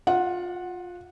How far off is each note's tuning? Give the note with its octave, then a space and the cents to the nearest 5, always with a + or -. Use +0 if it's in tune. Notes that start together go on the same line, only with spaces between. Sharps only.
F4 +20 F#5 -10